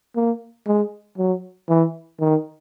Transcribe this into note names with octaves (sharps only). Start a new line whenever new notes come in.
A#3
G#3
F#3
E3
D#3